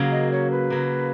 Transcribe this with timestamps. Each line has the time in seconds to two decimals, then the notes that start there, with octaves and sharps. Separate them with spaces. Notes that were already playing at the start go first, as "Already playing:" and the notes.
Already playing: C#3 F#3 A#3
0.11 D#5
0.31 C#5
0.51 B4
0.70 C#3 F#3 A#3